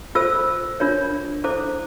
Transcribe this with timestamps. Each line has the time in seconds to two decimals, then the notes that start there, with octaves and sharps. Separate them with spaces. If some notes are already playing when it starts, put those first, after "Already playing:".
0.15 F4 A4 C5 E6
0.80 D4 F4 A#4 C#5
1.44 E4 A4 C5 D6